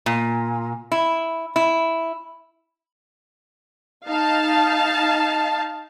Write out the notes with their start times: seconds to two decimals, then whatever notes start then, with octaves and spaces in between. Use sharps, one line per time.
0.06 A#2
0.92 E4
1.56 E4
4.07 D#4 F5 A5